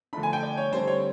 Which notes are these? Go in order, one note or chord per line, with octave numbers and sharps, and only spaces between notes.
D3 F3 A3 D4 B5
G#5
G5
D5
C#5
D3 G3 C4 C5
C#5